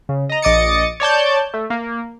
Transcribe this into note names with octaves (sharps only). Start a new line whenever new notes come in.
C#3
D#5 A#5
A#1 D#5 D6 D#6 A6 C#7
C#5 D5 A5 G6
A3
A#3